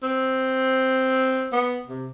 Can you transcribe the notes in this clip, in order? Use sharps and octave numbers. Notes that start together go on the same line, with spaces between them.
C4
B3
C3